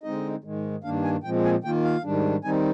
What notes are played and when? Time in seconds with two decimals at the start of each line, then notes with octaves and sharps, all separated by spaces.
0.03 D3 G#3 C4 D#4 D#5
0.44 G#2 D#3 G#3
0.84 G2 D#3 A#3 D4 F5
1.04 G#5
1.24 A#2 F3 G#3 C4 G5
1.44 G#5
1.64 D#3 A#3 F4 G5
1.84 F5
2.04 G#2 D#3 G3 D4
2.44 D#3 G3 C4 D#4 G#5